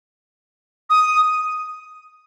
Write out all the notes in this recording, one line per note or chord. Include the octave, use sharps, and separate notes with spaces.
D#6